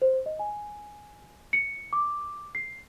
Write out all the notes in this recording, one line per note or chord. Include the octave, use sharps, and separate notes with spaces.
C5
D#5
G#5
C#7
D6
C7